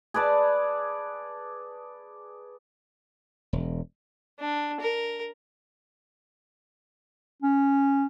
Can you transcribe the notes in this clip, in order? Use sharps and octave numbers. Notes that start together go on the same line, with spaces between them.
G#4 B4 D5 A5
E1
D4
A#4
C#4